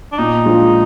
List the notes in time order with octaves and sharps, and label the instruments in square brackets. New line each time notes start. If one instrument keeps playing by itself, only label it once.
[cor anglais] D4
[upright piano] A#2 [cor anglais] D#4
[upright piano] F3 G#3 D4 F4